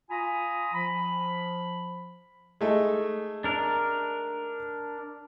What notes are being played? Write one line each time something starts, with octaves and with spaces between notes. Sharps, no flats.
F4 G#5 A#5 B5 D#6
F3 B5
G#3 A3 D#4
D4 A#4